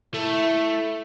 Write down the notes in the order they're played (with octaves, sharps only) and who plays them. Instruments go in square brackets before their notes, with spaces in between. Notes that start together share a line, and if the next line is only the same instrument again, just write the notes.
[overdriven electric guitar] A3 [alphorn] E4